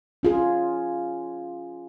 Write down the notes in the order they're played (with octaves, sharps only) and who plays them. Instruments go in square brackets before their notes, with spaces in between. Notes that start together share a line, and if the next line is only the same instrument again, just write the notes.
[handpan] C#4 F4 G#4